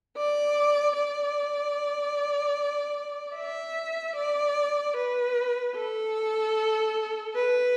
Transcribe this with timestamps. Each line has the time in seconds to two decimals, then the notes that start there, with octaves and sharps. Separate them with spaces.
0.17 D5
0.96 D5
3.36 E5
4.16 D5
4.96 B4
5.75 A4
7.35 B4